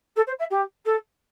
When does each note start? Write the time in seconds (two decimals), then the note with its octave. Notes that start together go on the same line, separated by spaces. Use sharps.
0.16 A4
0.27 C5
0.39 E5
0.50 G4
0.85 A4